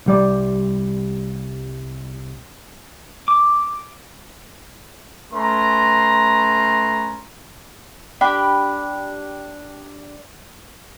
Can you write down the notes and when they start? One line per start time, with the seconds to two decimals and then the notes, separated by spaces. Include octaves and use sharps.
0.06 C2 G3 D5
3.28 D6
5.33 A3 C#4 B4 A#5 C6
8.21 D4 G4 B5